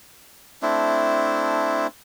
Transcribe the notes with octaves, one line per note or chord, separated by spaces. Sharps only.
A3 C4 D4 E4